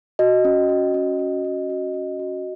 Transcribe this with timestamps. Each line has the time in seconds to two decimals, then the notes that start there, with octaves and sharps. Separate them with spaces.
0.19 F#4 D#5
0.45 C#4
0.69 F#4
0.94 C#4
1.19 F#4
1.45 C#4
1.69 F#4
1.94 C#4
2.19 F#4